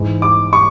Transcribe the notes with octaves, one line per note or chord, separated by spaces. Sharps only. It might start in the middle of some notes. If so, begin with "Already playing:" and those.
Already playing: G#2 E3
D6
C#6